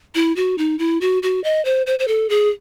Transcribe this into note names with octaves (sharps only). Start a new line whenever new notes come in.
E4
F#4
D#4
E4
F#4
F#4
D#5
C5
C5
C5
A4
G#4